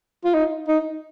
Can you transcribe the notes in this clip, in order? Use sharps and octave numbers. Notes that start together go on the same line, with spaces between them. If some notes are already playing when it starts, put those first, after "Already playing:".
F4
D#4
D#4